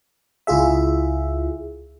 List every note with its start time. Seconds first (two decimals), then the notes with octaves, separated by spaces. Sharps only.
0.47 C#2 E4 F4 G#4 E5